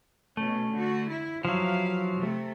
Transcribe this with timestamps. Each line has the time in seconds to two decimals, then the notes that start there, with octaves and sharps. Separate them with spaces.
0.37 B2 A3 C#4
0.72 D3 F#4
1.09 E4
1.45 G2 F3 F#3 E4 F5
2.17 C3 A3